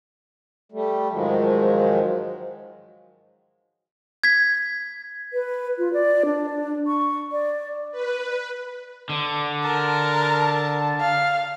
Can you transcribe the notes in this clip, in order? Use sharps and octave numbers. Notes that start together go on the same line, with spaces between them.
G3 A3
G#2 D#3 F3 F#3 G#3
G#6 B6
B4
F4
D5
D4
C#6
D5
B4
D3
A#4 A5
F5